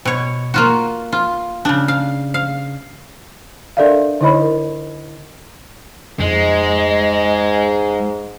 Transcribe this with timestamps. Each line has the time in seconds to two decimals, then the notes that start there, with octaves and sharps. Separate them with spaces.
0.05 B2 C#5
0.54 A#3 F4 F#4
1.12 F4
1.65 C#3 D4
1.88 F5
2.34 F5
3.77 D4 A4 A#4 D5 E5 F5
4.21 D3 D#4 E4 C#5 D#5 B5
4.42 A#4
6.20 F2 G#2 G#3 D#5